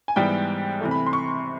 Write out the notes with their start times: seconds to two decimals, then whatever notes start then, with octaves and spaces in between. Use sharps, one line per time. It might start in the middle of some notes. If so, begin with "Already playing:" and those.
0.08 G#5
0.16 G#2 E3 G3 B3 G5
0.81 C3 E3 A3
0.91 B5
1.06 C6
1.13 C#6